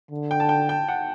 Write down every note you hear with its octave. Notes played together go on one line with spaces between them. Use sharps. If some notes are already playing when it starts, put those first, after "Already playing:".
D3
G5
A5
G5
G5
F#5